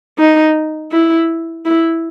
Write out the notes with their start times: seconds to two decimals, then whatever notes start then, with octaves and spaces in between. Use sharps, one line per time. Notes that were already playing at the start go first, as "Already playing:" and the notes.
0.19 D#4
0.92 E4
1.65 E4